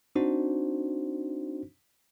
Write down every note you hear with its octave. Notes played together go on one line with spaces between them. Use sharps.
C4 D4 D#4 F#4 C5